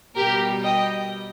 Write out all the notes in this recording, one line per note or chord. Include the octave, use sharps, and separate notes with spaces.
B2 G3 G4 A#4
D#5 G5